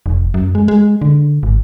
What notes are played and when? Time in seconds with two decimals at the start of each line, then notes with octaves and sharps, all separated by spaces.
0.06 F1
0.34 F#2
0.55 G#3
0.68 G#3
1.02 D3
1.43 G#1